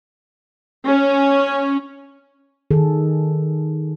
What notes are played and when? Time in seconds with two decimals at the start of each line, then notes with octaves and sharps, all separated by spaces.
0.87 C#4
2.71 D#3 G#4 A4